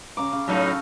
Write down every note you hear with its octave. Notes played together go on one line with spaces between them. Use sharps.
C#3 A#5 D6
C#3
A2 F#3 D#4 A4 F5 C#6